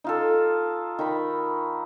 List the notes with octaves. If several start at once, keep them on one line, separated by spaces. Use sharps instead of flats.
D#4 F4 A4
D#3 D#4 B5